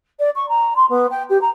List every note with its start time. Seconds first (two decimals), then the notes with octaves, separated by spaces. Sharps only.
0.19 D5
0.35 C#6
0.49 A#5
0.76 C6
0.89 B3
1.10 G5
1.29 G4
1.41 A#5